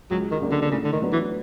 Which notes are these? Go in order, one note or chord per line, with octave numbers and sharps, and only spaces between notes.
C#2 F#3
D#3
C#3 F#3 A#3 D4
D3
D3
A2 C#3
D3
D#3
F#3 B3 D4
E3